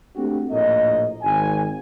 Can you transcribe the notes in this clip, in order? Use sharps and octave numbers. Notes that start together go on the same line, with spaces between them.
A3 C4 D4 F#4 G4
A#1 A2 A3 A#3 D#5
G#1 G#5